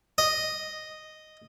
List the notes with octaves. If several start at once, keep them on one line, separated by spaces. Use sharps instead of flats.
D#5